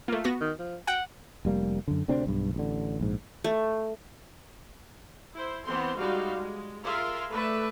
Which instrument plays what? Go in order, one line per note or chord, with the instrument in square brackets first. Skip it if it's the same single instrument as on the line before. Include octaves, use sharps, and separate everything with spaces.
[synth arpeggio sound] A3 A#3 [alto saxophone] F4
[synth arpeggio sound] B3 F#4 A#6
[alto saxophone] D#3
F3
[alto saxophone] F#5 [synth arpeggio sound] G5
[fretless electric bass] F1 G3 A#3
F#2 D3
D2 C3 C4 D4
B1 G2
A1 D3
A#1 G#2
[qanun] A3
[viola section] E4 C5
E3 B3 C4 C5 C6
G3 G#3 D#4 F#4 F5
G#3
F4 G#4 A#4 E5 F5 C6
A3 B4 D5 E5